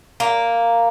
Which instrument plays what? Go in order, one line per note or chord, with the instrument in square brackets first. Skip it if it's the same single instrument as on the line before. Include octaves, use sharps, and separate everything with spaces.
[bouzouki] A#3